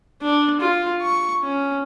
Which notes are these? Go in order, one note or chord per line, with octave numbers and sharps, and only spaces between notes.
D4
F4
C#6
C#4